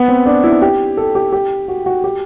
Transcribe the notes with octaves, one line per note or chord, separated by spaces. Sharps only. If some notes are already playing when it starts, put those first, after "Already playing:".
Already playing: B3
C4
D4
E4
G4
A4
G4
G4
F#4
F#4
G4